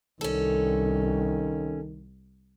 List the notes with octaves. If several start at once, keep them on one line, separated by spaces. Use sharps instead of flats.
C2 D#3 C#4 A4